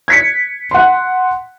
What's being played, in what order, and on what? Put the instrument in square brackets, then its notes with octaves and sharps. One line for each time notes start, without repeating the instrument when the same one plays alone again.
[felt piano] G#6 B6 C#7
F#5 C6